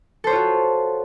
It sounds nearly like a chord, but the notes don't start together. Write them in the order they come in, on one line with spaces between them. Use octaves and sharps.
A4 C5 C#5 F4 F#4